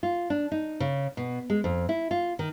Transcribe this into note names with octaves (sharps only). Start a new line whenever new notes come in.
F4
D4
D#4
C#3
B2
G#3
F2
E4
F4
D#3